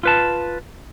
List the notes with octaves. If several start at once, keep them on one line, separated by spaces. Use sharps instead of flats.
F4 B4 A5